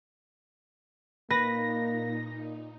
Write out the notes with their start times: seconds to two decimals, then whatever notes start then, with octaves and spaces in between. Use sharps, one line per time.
1.31 A#2 A#3 D#4 B4 A#6